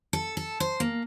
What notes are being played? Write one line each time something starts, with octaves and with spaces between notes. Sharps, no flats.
A4
A4
C5
A#3